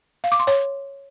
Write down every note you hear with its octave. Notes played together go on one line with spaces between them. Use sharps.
F5
D6
C6
C#5